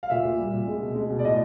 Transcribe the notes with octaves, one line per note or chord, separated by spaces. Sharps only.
F5
A#2 E5
A#2
G3
A#2
G#3
B2
G#3
B2
D5
A2 D#5